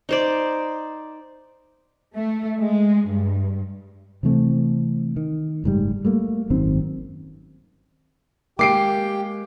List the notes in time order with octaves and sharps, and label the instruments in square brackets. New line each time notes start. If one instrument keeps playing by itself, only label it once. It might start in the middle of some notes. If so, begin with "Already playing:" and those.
[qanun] D#4 C5 D5
[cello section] A3
G#3
G2
[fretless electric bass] C3 E3 A3 C4
D#3
F#1 G#2 C3 G3
G3 A3 A#3
G#1 F#2 D#3 C4
[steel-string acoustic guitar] G#3 A#3 [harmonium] G4 G5 [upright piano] D6 C7 D7